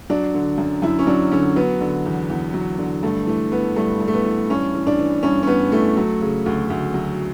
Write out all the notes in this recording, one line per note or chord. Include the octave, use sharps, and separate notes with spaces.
F#3 D4
D3
F#2
F#2 E4
C#4
F#3 D4
D3 C#4
F#3 B3
D3
E2
E2
F#3
D3
G2 A3
E3 A3
E3 B3
G2 A3
G2
A3
B3
E3
G2 C#4
E3
D4
E3
G2 C#4
C#4
G2 B3
E3 A3
F#3
C#3
D2
D2
F#3